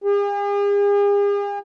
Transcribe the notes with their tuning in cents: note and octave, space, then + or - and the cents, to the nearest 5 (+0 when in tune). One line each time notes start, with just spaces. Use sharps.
G#4 -45